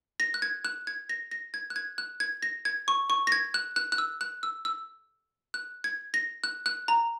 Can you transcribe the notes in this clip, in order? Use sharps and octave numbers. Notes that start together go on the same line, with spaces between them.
A#6
F#6
G#6
F#6
G#6
A#6
A#6
G#6
F#6
G#6
F#6
G#6
A#6
G#6
C#6
C#6
A#6
G#6
F#6
F#6
F#6
E6
F#6
E6
E6
F#6
G#6
A#6
F#6
F#6
A#5